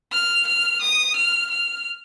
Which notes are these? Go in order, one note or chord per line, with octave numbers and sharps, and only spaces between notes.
F6
F6
D#6
F6
F6